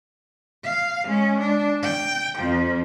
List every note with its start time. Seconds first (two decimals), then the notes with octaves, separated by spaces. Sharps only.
0.64 F5
1.06 G#3 C#4
1.40 D4
1.82 G5
2.37 F2 F3